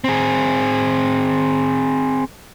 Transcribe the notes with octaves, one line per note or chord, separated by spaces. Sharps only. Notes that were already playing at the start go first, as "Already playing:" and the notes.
C4 G#4